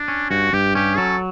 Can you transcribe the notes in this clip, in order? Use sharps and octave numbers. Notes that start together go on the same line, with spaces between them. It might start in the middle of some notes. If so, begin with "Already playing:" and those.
Already playing: D4
C#4
G2 F#4
G2 G4
C#4 G4
F#3 A4